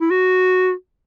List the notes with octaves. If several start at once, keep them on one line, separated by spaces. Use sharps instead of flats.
E4
F#4